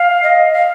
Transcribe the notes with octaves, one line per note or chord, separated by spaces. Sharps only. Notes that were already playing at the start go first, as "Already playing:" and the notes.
Already playing: F5
D#5
F5